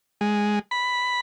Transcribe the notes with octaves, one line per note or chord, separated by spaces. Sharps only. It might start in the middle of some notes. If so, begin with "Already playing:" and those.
G#3
B5